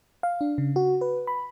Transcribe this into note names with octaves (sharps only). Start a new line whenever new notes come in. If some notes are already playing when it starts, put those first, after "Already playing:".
F5
D4
C#3
F#4
B4
B5